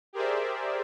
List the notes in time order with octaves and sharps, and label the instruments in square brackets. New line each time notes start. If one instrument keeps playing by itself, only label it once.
[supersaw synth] G4 G#4 A#4 C5 D5 E5